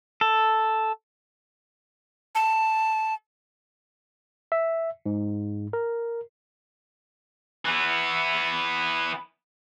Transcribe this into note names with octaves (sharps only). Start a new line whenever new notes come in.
A4
A5
E5
G#2
A#4
E3 B3